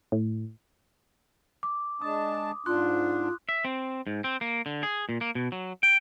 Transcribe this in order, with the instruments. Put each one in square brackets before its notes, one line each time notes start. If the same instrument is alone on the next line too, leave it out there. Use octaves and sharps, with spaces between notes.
[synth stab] A2
[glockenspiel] D6
[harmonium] G#3 D4 A5 [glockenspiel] D#6
[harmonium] G#2 D4 [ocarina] F4 [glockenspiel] C6 F#6
[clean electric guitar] E5
C4
G#2
C4
A#3
D3
G#4
A#2
A#3
B2
F#3
G5